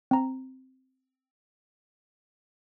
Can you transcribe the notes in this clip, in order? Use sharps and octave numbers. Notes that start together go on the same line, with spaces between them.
C4 A#5